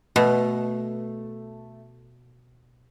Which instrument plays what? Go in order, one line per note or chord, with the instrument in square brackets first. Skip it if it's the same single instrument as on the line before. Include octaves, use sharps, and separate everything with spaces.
[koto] B2 [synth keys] A3